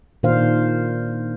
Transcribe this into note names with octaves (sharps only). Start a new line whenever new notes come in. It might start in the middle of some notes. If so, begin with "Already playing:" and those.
A#2 D#3 D4 C5 F5